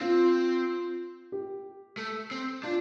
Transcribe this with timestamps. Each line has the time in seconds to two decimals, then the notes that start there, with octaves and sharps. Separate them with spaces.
0.01 C4 F4
1.32 G4
1.97 A3
2.31 C4
2.63 D4 F4